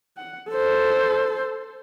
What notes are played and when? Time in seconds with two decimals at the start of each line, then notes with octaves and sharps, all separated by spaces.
0.17 F#5
0.50 A4 C5